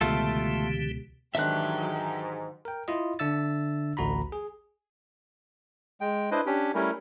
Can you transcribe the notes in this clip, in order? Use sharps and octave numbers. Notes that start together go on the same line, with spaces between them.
C#2 B2 D3 E3 A3 F4 G4 A4
G#2 D#3 E3 F#3 D4 G4 E5 F#6
A#4 G5
E4 F4 D#5
D3 D4 E5 E6 A6
A1 D2 F#4 A#5 B5
G#4
G#3 G5
D4 E4 B4 C5 D#5
C#4 D4 G4
G3 A3 C#4 E4 A#4